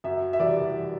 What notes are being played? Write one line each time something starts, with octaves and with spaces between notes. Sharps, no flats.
F#2 E5
E5
E3 G3 D5